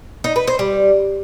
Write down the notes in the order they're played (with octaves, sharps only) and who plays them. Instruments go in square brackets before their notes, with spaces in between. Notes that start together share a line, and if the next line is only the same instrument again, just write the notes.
[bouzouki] D#4
B4
C5
G3